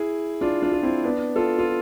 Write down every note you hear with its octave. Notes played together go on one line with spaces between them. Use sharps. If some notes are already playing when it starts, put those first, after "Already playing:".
Already playing: E4 G#4
D4 F4
D4 F4
F4
C4 E4
B3 D4
F4 A4
F4